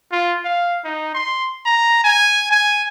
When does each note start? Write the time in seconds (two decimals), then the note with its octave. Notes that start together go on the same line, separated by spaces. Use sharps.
0.12 F4
0.45 F5
0.84 D#4
1.15 C6
1.66 A#5
2.04 G#5
2.51 G#5